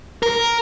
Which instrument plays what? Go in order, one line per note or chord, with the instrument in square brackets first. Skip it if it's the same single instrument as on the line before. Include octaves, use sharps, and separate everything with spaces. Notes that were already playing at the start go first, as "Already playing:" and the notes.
[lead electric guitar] A#4